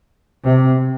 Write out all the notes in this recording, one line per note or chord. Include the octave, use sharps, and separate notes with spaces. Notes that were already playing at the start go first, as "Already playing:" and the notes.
C3